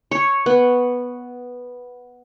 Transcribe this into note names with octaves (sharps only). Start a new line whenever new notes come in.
C#5
B3